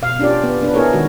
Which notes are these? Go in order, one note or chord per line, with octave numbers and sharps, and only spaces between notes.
B2 F5
C#4 D4 F4 G4 D5
B3
B3 D4 B4
B3 E4 G#4 A#4 C#5
D#3 G#3 F#4